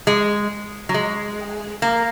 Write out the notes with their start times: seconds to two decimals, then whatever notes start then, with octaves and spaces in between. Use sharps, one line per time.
0.07 G#3
0.89 F#3
0.94 G#3
1.82 A#3